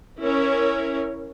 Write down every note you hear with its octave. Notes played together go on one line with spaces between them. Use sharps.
C#4 E4 A#4 C#5